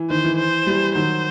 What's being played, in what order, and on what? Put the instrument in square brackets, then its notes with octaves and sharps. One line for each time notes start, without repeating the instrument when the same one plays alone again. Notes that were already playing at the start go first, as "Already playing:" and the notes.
Already playing: [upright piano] E3
[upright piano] D#3 [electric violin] C5
[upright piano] E3
[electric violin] C5
[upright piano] E3 G3
[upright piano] D#3 F#3 [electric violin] C5